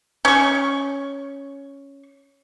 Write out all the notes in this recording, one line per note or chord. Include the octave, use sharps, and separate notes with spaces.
C#4 C#6